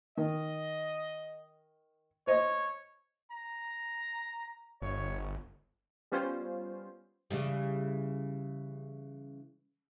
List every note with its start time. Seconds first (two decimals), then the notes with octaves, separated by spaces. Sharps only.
0.17 D#3 D#5
2.27 C5 C#5 D#5
3.31 A#5
4.82 G1 C#5
6.12 G3 B3 C#4 F4 C5
7.31 C#3 E3 G3